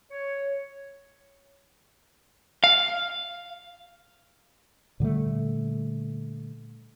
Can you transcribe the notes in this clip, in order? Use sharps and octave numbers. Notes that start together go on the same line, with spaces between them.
C#5
F5
A#2 D3 G3 A3